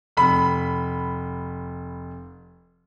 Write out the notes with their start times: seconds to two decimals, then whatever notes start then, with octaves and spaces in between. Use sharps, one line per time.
0.17 F1 B5